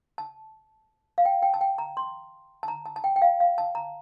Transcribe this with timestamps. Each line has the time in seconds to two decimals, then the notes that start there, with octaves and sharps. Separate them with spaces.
0.18 A5
1.18 F5
1.25 G5
1.43 G5
1.54 A5
1.61 G5
1.78 A#5
1.97 C6
2.63 A5
2.68 A#5
2.86 A5
2.96 A5
3.04 G5
3.16 G5
3.22 F5
3.40 F5
3.58 A5
3.75 A#5